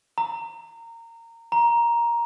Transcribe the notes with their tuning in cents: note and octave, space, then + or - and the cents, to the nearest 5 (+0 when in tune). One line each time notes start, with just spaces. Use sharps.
A#5 -20
A#5 +10